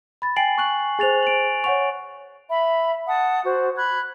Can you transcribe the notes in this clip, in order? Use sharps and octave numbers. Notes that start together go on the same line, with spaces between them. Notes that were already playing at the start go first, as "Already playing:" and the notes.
B5 A6
G5 G#5 A6 C7 D7 F#7
C#6 F#6 F#7
G#4 C5 G#5 A6 F7
D7 F#7
C#5 F#5 C#6 F7
E5 B5
F#5 A5 D#6
F#4 C5
B5 F#6 G#6